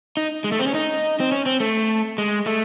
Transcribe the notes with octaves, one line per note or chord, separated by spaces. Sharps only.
D#4
G#3
A3
C4
C#4
D#4
C4
C#4
C4
A3
G#3
A3